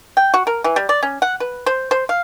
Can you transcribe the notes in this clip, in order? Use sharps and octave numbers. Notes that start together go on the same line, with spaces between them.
G5
F#4
A#4
E3
G3
D5
C#4
F#5
B4
C5
C5
F5